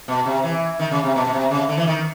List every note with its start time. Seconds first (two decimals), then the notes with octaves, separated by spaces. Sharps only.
0.08 B2
0.26 C3
0.44 E3
0.79 D#3
0.91 C#3
1.04 C3
1.16 B2
1.26 B2
1.33 C3
1.51 C#3
1.69 D3
1.77 E3
1.87 D#3